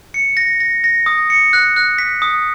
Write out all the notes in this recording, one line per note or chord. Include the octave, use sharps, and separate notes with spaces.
C#7
A#6
A#6
A#6
D#6
C#7
F#6
F#6
B6
D#6